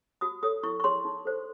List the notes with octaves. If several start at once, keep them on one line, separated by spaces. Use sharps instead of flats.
F#4 D#6
A4 C#5 D#6
E4 C#6
C#6
G#4 C#5 C6
D#4
A4 C5